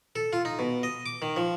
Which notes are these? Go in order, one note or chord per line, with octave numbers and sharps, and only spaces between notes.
A4
F4
D#4
B2
D#5
D6
D#3
F3